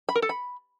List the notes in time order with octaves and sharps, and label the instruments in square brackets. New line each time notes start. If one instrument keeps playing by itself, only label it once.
[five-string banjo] B5
A#4
A4
B5